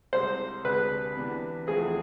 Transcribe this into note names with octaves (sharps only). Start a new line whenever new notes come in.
C2 C3 G#3 C5
D2 C3 G#3 D4 G#4 B4
C3 E3 B3 D4
E2 C3 F3 A3 C4 G#4